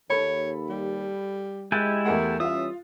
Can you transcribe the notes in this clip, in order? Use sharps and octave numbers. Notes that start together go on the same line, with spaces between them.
D#2 A4 C#5 B5
G3
G#3 E4 G4 G#5 F#6 A6
E2 A3 A#4 F#5
E3 G3 C#4 F4 E5 F5 D#6